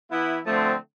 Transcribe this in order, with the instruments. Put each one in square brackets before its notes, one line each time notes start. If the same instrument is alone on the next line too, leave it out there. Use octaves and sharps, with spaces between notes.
[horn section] E3 B3 E4
D3 F3 A3 C4